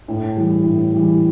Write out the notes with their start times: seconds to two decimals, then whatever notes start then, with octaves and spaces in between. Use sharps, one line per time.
0.08 A2
0.36 E3 G3
0.64 A2
0.92 E3 G3